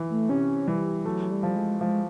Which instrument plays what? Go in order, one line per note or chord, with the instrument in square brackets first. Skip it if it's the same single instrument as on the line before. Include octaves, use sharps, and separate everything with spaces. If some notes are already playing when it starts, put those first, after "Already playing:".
Already playing: [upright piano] E3
[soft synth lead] A3
[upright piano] C3 [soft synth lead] C#4
[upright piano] E3 [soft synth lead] G3
[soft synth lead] F#3 [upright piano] A3
[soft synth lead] G3
[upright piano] F3
[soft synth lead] G#3
[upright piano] F3 [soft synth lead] G#3